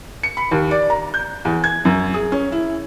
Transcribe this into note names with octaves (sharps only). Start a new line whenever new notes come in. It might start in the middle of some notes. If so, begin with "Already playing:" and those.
C#7
B5
D#2
D5
A#5
G6
E2
G#6
F#2
G#4
C#4
E4